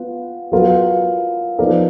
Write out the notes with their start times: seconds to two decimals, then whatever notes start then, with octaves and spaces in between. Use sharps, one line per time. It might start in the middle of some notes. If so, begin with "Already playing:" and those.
Already playing: B3 F4
0.52 F#3 B3 F4 A#4
1.59 F3 B3 D#4 A#4 D5